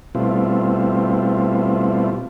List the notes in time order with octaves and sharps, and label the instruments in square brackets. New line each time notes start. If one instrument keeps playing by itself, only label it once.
[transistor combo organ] B2 G3 A3 C4 E4 F4